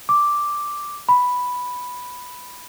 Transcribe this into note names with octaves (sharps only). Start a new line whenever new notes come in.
D6
B5